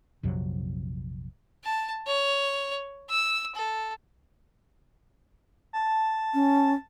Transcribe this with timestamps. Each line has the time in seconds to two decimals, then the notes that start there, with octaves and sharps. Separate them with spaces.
0.23 A#1 F2 C3 F#3
1.64 A5
2.07 C#5
3.10 E6
3.55 A4
5.73 A5
6.34 C#4